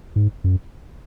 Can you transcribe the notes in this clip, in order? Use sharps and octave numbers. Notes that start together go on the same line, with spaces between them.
G#2
F#2